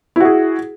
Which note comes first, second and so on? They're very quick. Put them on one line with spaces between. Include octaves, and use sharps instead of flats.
E4 F#4 G#4